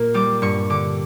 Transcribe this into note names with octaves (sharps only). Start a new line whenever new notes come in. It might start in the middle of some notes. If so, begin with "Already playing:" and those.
Already playing: A#2 A#3
G3 D6
G2 C#6
D3 D6